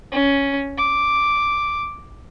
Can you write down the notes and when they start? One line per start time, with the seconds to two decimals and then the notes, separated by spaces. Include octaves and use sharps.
0.12 C#4
0.78 D6